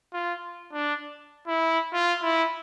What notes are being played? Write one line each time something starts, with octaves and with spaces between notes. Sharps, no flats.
F4
D4
E4
F4
E4